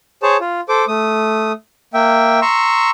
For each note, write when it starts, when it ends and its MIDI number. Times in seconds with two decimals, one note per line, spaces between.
0.23 0.37 68
0.23 0.37 72
0.23 0.37 73
0.23 0.37 81
0.40 0.61 65
0.69 0.85 69
0.69 0.85 72
0.69 0.85 86
0.88 1.52 57
0.88 1.52 87
1.94 2.40 58
1.94 2.40 76
1.94 2.40 79
2.42 2.91 82
2.42 2.91 84
2.42 2.91 85
2.42 2.91 88